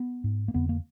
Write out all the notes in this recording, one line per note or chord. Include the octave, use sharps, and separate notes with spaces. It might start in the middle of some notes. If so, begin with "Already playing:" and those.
Already playing: B3
G#2
A#3
F2 D3 B3
A#3